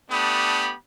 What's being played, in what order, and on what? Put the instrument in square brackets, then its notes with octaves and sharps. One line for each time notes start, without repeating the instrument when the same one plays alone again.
[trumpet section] A3 B3 D4 G4 B5 D#6